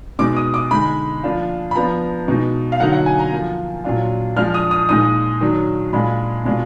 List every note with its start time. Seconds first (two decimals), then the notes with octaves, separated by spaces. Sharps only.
0.19 B2 G#3 D#4 D6
0.36 D#6
0.54 D6
0.71 D3 G#3 D#4 B5
1.23 F3 A#3 D4 F4
1.71 B5
1.76 F3 B3 D4 A#5
2.28 B2 G#3 D#4
2.72 F5
2.79 D3 F#3 A#3 D#4 F#5
2.92 F#5
3.06 G#5
3.19 A#5
3.32 F3 A#3 F4
3.84 A#2 F#3 D4 F4
4.36 F3 G#3 D4 F4 F6
4.54 D#6
4.71 D#6
4.89 A#2 G#3 D#4 D#6
5.41 D#3 F#3 D4
5.93 A#2 G#3 D4 F4 B5
6.45 B2 G#3 D4 F4